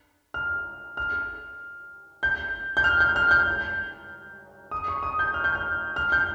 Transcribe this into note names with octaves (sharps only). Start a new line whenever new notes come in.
F6
F6
G6
G6
F6
G6
F6
G6
D#6
C#6
D#6
G6
F6
G6
F6
F6
G6